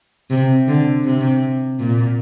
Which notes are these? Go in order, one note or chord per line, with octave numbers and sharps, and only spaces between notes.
C3
D3
C3
A#2